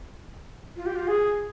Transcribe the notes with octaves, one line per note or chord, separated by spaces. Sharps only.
F4
G4
F4
G#4